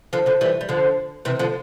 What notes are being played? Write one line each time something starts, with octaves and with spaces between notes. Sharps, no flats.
D3 F3
D3 F3
E3 G3
G3
D3 F3
C3 E3
D3 F3